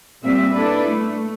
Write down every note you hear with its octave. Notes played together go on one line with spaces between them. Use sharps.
A#2 G3 C4 E5
D4 E4 A4 B4 D5
A3